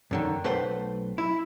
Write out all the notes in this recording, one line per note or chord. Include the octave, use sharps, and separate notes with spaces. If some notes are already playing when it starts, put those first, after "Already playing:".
F#2 D3 D#3
B1 A3 B4 C5 F#5 G5
E4